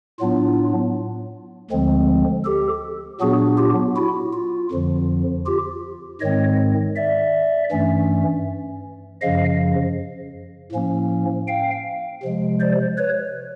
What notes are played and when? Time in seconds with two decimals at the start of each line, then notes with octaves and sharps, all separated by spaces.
0.19 A2 F#3 B3 D4 F4
1.70 D2 D3 F3 G#3 C4
2.45 G4 A4
3.20 A#2 F#3 B3 D4 F#4 G#4
3.58 F4 G4
3.96 E4 F#4
4.33 F4
4.72 F2 D3 F3
5.46 F4 G4
6.21 G#2 D#3 G#3 C4 C#5 D#5
6.96 D5 E5
7.71 G2 E3 A3 C#4
9.21 F#2 C#3 F3 D#5 F5
10.72 A2 F3 A#3 C#4
11.47 F5 G5
12.23 C3 F3 G#3
12.59 C5 D5
12.97 B4 C#5